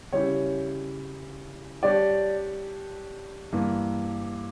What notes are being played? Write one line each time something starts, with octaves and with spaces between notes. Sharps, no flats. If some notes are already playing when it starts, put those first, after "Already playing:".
C#3 G3 C#4 E4 G4 C#5
G3 D4 G4 C#5 D5
G2 E3 A#3